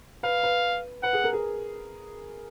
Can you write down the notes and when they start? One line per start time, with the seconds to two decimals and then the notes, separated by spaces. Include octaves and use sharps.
0.23 B4 F5
0.43 B4
1.03 B4 F#5
1.13 G#4
1.24 A#4
1.33 G#4